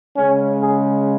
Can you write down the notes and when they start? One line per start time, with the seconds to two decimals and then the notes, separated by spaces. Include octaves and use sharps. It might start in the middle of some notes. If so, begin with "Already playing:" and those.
0.16 C#3 G#3 C#4
0.62 G#4